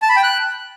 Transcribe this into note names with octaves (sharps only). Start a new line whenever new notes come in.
A5
B5
G5
F#6